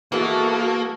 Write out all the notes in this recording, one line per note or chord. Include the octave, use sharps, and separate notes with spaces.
E3 G#3 A#3 B3 F#4 A4